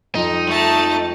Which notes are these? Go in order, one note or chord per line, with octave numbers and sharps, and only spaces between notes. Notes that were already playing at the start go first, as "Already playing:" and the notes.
F2 D#4
G#3 A3 A5